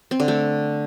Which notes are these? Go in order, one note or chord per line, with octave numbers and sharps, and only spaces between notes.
C4
D3
A3